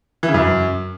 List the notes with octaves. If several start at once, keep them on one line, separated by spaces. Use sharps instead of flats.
E3
C#3
F#2